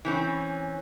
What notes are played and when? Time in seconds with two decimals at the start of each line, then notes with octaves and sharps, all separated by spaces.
0.05 E3 C4 C#4